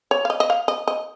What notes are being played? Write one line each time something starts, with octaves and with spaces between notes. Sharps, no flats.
C#5
F5
D#5
D#5
F5
D#5
D#5